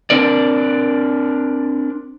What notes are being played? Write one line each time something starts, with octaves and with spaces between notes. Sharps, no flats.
C4 D4 A#4 D5